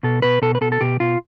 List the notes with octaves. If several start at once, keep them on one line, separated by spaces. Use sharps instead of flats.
B2 A4
B2 B4
B2 A4
B4
B2 A4
A4
B2 G4
B2 F4